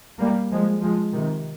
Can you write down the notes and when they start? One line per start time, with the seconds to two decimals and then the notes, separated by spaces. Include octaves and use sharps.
0.19 G3 A#3
0.51 F3 G#3
0.82 F3 G#3
1.13 C3 D#3